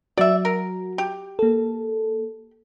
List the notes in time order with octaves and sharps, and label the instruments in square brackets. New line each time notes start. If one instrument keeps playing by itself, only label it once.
[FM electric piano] F#3 F#4 [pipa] D5 E5
[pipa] A#4
G4
[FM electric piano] A#3 A4